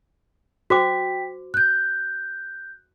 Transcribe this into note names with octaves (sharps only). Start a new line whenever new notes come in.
F#4 C5 G5 D6 B6
F#6 G6